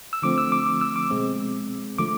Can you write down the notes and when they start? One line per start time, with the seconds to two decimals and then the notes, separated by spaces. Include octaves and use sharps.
0.13 E6
0.22 D3 F3 A3 C4 D6
0.38 E6
0.52 D6
0.66 D6
0.81 E6
0.96 D6
1.10 B2 G#3 C4
1.98 D3 F3 A3 D6